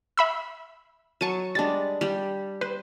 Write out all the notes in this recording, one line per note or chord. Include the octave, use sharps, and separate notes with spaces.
E5 B5 E6
F#3 A5 C#6 C#7 D#7
G3 G#3 D4 A6
G3 G4
B4 C5